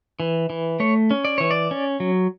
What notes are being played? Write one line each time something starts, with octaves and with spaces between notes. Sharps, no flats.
E3
E3
A3 C#5
C#4
D5
E3 C#5
D5
C#4
F#3